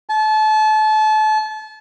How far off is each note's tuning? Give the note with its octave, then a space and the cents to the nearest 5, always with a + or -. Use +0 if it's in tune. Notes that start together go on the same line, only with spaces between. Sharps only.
A5 -30